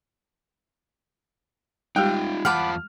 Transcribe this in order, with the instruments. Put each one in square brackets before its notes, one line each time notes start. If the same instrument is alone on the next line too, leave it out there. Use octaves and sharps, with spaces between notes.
[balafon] G3 G#3 G4 [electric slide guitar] D#4 F4 [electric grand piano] G5
[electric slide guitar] E2 F4 A5 [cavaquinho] F#5 B5 D6 [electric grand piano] F6